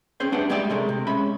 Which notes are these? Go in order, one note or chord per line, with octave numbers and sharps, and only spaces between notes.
C4 C#4 G#4 C5
G3 A3 D4 B4 F#5 G5
G3 G#3 A#3 G4 D5 E5
C3 G#3 A3 A#4
C3
G#3 C#4 E5 B5